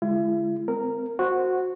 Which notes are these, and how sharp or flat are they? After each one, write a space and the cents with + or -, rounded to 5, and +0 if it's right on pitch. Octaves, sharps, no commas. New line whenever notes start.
D3 -25 G#3 +0 E4 +40
C4 -40 A#4 -10
F#4 -10 C5 +0